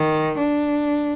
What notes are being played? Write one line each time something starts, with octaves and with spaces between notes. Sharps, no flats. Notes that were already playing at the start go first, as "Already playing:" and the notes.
Already playing: D#3
D4